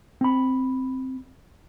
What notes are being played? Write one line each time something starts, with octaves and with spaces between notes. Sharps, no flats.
C4 B5